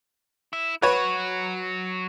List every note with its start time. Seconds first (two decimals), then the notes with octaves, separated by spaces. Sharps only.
0.53 E4
0.82 F#3 F#4 B4 C#5